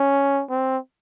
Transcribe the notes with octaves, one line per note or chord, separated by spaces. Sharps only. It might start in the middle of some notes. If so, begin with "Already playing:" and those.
Already playing: C#4
C4